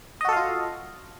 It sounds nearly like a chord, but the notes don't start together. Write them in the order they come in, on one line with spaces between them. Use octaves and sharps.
D#5 F#4 A4 F5 F4